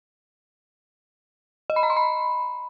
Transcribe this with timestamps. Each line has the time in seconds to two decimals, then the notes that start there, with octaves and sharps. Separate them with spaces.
1.70 D#5
1.76 B5
1.83 A#5
1.90 C6
1.97 B5